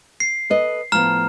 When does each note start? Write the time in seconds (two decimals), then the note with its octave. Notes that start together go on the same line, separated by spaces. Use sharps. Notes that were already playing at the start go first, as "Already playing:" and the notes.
0.20 C7
0.50 A4 B4 D#5
0.92 A2 F3 B3 A#5 F6